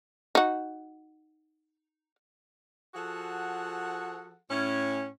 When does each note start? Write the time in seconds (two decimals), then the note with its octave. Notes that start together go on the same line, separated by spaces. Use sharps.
0.35 D#4 F#4
2.95 F3 F#4 G#4 A4 F#5
4.50 A2 C#4